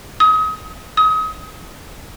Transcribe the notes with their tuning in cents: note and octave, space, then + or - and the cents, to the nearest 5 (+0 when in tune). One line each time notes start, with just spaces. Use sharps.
D#6 +30
D#6 +30